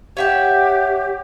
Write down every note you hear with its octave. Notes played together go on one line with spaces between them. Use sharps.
G4 C#5 E5 F#5